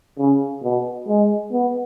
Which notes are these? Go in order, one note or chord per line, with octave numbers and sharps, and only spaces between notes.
C#3
B2
G#3
B3